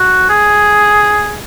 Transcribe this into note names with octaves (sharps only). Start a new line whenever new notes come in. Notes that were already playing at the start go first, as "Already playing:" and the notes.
Already playing: F#4
G#4